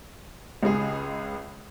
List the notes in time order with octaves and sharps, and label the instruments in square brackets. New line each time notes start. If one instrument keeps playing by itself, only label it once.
[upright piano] C#2 C#3 G#3 G#4